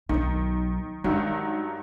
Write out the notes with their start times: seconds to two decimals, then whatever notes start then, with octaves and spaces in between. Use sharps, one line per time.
0.09 B1 D#3 F#3
1.04 G2 D#3 F#3 G#3